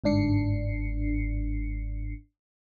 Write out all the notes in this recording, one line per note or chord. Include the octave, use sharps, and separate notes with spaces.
G1 G#2 D4 C7 C#7